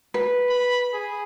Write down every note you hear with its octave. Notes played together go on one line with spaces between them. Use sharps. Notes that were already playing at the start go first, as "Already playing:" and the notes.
B4
B5
G#4